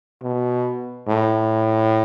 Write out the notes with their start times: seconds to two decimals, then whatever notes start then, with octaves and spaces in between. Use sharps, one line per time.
0.23 B2
1.08 A2